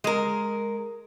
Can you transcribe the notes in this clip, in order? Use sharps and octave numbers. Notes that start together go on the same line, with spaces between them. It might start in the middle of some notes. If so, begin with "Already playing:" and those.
G#3 A#4